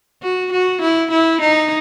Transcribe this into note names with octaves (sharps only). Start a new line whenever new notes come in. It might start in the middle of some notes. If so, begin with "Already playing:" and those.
F#4
F#4
E4
E4
D#4